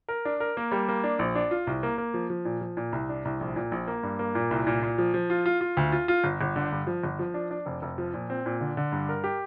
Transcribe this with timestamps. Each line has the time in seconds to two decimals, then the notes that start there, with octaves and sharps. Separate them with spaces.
0.09 A#4
0.25 D4
0.40 A#4
0.57 A#3
0.72 G3
0.88 A#3
1.04 D4
1.19 A#1
1.35 D4
1.51 F4
1.67 C2
1.83 A#3
1.98 A#3
2.14 F3
2.30 F3
2.45 A#2
2.61 F3
2.77 A#2
2.92 C2
3.09 D4
3.25 C2
3.41 A#1
3.56 A#2
3.72 A#1
3.87 A#3
4.03 G2
4.19 A#3
4.35 A#2
4.51 C2
4.67 A#2
4.82 A#2
4.98 F3
5.14 F3
5.30 F4
5.46 F4
5.61 F4
5.77 D2
5.92 F4
6.08 F4
6.24 G1
6.41 G1
6.56 D3
6.72 G2
6.87 F3
7.03 G1
7.19 F3
7.34 D4
7.51 D4
7.66 F1
7.82 F1
7.98 F3
8.14 A#2
8.30 C4
8.46 A#2
8.61 D3
8.77 D3
8.92 G2
9.09 A#4
9.24 G4